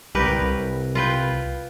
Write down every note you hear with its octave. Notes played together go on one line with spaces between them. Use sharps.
C2 G4 A#4 B4
C2
F4 B4 G5